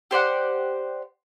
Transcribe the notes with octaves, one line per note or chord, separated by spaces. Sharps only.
G4 C5 D5 F#5